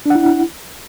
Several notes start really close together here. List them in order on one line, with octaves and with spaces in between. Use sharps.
D4 F#5 E4